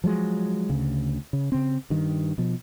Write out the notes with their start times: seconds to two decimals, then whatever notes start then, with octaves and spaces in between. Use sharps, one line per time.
0.04 F3 F#3 G#3
0.70 D2 C#3
1.33 C#3
1.52 C#3 C4
1.90 G2 D#3
2.38 B2 F3